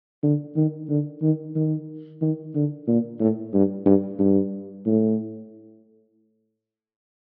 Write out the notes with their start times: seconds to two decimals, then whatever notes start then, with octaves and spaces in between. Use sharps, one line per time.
0.23 D3
0.56 D#3
0.89 D3
1.22 D#3
1.56 D#3
2.21 D#3
2.55 D3
2.87 A#2
3.20 A2
3.53 G2
3.86 G2
4.19 G2
4.86 A2